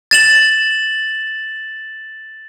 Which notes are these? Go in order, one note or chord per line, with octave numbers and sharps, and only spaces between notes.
A6 E7 F#7